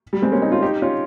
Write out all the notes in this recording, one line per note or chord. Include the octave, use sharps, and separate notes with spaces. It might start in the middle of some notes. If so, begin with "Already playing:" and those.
G3
G#3 C4
A#3 C#4
C4 D#4
C#4 F4
D#4 G4
C#4 F4